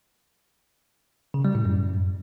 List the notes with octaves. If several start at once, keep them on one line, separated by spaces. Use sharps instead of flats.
C#3
G3
A2
F#2